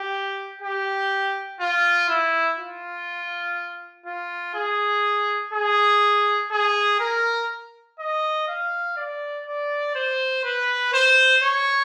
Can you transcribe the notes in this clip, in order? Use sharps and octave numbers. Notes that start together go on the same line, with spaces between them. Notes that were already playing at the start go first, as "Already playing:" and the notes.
Already playing: G4
G4
F4
E4
F4
F4
G#4
G#4
G#4
A#4
D#5
F5
D5
D5
C5
B4
C5
C#5